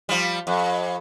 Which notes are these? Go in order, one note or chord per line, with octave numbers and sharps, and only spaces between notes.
F3 G3
F2